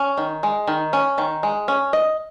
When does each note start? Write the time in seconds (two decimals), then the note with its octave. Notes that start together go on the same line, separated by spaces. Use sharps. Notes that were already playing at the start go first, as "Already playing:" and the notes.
Already playing: C#4
0.18 D#3
0.43 G#3
0.68 D#3
0.93 C#4
1.18 D#3
1.43 G#3
1.68 C#4
1.93 D#5